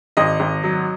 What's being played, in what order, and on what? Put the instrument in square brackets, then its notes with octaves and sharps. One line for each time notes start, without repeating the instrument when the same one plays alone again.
[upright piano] G#1 D#5
G#1
F#3